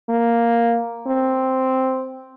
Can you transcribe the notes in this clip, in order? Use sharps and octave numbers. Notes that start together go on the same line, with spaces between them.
A#3
C4